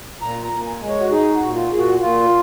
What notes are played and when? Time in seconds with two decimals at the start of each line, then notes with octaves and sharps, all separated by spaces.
0.21 A#2 A#5
0.44 A#5
0.52 A#2
0.66 G#5
0.81 G#3
0.88 C#5
1.00 F#4
1.11 D#4 G#4
1.34 F#4
1.41 A#2
1.55 F4
1.71 A#2 G#4
1.78 F#4
2.00 A#2 F4